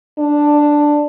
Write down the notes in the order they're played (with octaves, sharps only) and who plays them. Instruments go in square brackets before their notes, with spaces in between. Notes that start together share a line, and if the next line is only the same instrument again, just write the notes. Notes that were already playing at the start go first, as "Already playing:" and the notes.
[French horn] D4